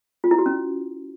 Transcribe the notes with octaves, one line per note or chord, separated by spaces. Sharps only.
F4
E4
F#4
C#4